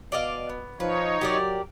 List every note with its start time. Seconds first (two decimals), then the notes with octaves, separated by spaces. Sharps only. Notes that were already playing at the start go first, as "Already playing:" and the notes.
0.12 B2 D5 D#5 F5
0.50 B3
0.80 F3 D#4 B4 C#5
1.21 F#3 G4 A#4 D5